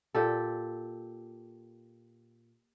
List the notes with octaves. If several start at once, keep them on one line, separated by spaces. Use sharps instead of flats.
A#2 G4 A4